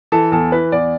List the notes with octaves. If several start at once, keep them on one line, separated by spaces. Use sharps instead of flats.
E3 A4
E2 A4
E3 B4
E2 D5